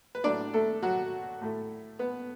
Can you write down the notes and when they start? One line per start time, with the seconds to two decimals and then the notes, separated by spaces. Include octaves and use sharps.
0.15 B4
0.24 A2 F#3 A3 D4 D5
0.54 A3 A4
0.82 F#3 F#4
1.41 A2 A3
1.99 B3 B4